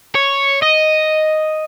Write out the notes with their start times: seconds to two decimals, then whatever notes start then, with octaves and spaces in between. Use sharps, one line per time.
0.15 C#5
0.63 D#5